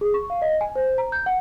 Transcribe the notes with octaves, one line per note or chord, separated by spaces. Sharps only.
G#4
C#6
F5
D#5
G#5
C5
A#5
G6
F#5